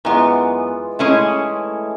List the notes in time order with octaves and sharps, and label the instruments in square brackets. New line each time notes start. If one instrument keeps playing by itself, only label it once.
[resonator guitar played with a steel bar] F#2 B3 [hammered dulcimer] E3 G#3 F4
[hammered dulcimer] E3 A3 [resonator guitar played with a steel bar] G#3 C#4 E4